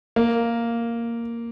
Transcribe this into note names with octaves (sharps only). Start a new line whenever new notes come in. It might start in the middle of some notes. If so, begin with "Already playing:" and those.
A#3